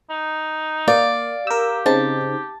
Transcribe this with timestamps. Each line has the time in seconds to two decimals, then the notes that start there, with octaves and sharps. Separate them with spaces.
0.10 D#4
0.88 A#3 D5 F5
1.47 G4 A#4 E6
1.86 C#3 C4 D#4 A5